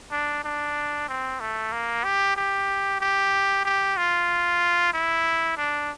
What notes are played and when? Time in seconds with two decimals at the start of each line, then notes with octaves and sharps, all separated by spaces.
0.12 D4
0.44 D4
1.08 C4
1.40 A3
1.72 A#3
2.04 G4
2.36 G4
3.01 G4
3.65 G4
3.97 F4
4.94 E4
5.57 D4